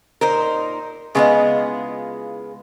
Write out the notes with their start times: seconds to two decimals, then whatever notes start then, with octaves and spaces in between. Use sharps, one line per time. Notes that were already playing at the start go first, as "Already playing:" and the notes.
0.21 A#2 D#4 A#4 C5
1.15 C#3 G#3 B3 E4 F4 D#5